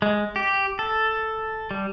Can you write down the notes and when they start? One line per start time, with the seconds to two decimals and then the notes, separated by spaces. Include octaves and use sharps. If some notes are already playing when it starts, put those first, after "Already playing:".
0.02 G#3
0.36 G4
0.79 A4
1.71 G3